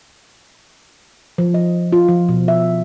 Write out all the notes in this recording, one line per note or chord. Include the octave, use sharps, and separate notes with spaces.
F3
D#5
F4
F3
B2
E5